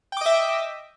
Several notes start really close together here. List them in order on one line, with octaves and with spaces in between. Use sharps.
G5 D6 D#5 E5